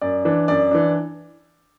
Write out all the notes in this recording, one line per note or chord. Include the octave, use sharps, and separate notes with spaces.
F#2 D5
E3 D4
F#2 D5
E3 D4